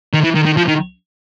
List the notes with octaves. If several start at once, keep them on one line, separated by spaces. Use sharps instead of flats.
D#3
E3
D#3
D#3
F3
D#3